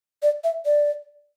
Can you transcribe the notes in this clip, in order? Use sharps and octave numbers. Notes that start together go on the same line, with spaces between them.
D5
E5
D5